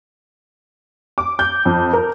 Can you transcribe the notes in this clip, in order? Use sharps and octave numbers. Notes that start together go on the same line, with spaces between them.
D6
G6
F2
A#4